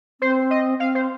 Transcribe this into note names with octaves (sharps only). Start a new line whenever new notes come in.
C4 C5
D#5
C4 F5
C5